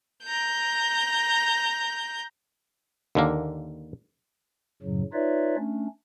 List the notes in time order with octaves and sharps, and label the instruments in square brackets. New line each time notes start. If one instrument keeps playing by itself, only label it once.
[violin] A#5 G6
[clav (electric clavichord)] D#2 D3 A#3
[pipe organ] F#2 A2 C#3 F#3
D#4 F4 B4 C#5 D5 E5
A3 C#4 D4